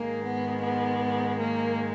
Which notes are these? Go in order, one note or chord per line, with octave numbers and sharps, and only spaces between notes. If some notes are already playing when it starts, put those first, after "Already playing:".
Already playing: G#2 D#3 G#3 A#3
B3
B3
A#3